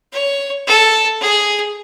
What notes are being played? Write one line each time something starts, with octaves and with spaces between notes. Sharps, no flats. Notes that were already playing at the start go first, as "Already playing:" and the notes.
C#5
A4
G#4